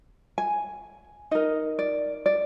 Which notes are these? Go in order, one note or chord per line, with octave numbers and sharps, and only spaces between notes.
G#5
D#4 A#4 D#5
D5
D5